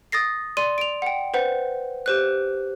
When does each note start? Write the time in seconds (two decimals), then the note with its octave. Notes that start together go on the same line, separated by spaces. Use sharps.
0.12 D#6 A6 A#6 C7
0.57 D5 C6 D#7
0.78 D7 F7
1.02 F#5 G5
1.34 B4 C5 F#5
2.06 G4 C5 F#6